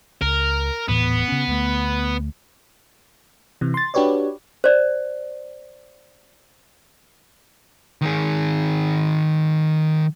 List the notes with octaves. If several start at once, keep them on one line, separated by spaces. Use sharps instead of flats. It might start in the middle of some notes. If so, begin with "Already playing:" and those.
C#2 A#4
D#1 A2 E3 B3
C#3 C#4
D2 A3
C3 E3
C6 A6
D4 F#4 G4 B4 C#5 D5
C5 D5
D#3 G#4